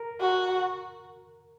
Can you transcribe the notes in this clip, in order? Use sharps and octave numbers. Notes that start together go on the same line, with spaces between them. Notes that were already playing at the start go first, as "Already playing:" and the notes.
Already playing: A#4
F#4